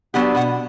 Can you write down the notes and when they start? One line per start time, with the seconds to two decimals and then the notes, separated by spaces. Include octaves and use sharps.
0.14 F#3 B3 D4 G4 F#5
0.35 B2 F#5